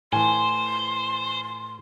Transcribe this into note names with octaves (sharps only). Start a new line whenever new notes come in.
A2 E3 C5 G#5 C6